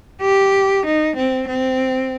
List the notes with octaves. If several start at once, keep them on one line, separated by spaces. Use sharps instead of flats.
G4
D#4
C4
C4